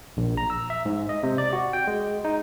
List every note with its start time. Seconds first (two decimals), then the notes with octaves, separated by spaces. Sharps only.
0.17 A#1
0.37 A#5
0.50 E6
0.70 E5
0.85 G#2
1.09 D#5
1.23 C3
1.38 D5
1.53 F#4
1.73 G5
1.87 G#3
2.25 D#4